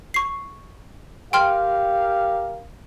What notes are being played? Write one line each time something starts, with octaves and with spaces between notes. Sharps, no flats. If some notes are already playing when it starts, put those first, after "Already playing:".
C#6 C7
G4 A#4 F5 G5 C6 F6